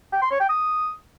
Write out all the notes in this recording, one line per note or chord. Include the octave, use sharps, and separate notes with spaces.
G5
C6
C#5
G5
D#6